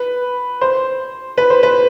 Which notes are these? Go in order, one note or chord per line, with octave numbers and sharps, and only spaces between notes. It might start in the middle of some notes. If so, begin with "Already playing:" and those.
Already playing: B4
C5
B4
C5
B4